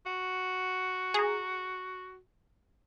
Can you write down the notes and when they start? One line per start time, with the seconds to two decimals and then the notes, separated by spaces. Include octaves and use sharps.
0.06 F#4
1.14 G#4 A#5